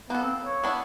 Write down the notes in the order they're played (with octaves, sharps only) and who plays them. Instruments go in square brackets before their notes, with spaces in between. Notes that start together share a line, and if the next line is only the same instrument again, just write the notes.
[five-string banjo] A#3 A4 [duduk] B3
[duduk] C4
C#5
[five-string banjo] B3 D4 E4